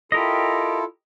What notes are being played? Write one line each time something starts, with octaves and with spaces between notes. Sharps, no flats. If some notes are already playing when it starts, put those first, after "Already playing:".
E4 F4 G4 A4 A#4 D#5